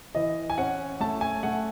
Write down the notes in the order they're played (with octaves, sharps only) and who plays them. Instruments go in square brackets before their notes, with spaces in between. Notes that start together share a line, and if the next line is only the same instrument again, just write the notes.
[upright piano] E3 D#5
G#5
C#4 F#5
A3 A5
G#5
A3 F#5